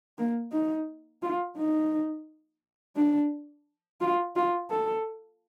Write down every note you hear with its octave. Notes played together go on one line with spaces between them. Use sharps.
A#3
D#4
F4
D#4
D4
F4
F4
A4